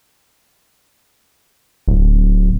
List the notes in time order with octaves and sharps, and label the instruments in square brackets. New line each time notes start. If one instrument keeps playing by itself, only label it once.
[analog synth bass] D1